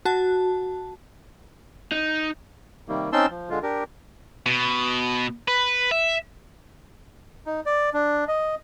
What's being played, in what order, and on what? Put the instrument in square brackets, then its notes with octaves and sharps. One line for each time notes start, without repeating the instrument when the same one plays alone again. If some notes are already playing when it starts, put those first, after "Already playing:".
[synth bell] F#4 A5
[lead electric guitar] D#4
[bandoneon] C3 D#3 G3 A#3
C4 C#4 D#4 A5 C6 E6
F3
D3 G#3 F4
D4 G4 A#4
[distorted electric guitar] B2
B4
E5
[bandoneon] D#4
D5
D4
D#5